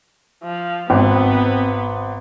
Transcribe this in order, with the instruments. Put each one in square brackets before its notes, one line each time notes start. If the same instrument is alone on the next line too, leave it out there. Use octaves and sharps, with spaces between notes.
[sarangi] F3
[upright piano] G#1 [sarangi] B3 [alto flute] C4